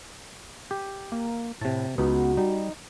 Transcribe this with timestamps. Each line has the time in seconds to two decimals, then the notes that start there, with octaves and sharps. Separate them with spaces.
0.71 G4
1.12 A#3
1.61 A2 C3 A5
1.98 C#2 B3 D#4 F#4
2.37 G3 D#4